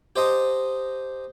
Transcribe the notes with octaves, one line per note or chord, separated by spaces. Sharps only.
G4 C5 D#5 A5